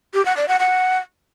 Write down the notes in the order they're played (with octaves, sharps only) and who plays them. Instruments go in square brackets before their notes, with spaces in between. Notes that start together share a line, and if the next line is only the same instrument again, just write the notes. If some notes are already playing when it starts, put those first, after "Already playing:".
[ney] G4
F#5
D5
F#5
F#5